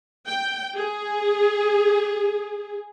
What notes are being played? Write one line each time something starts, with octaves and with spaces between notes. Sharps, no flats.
G5
G#4